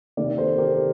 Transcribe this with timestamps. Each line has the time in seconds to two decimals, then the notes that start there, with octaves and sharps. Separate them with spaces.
0.17 C3 D#3 A#3 A#4 D5
0.38 A4 C5
0.58 G4 A#4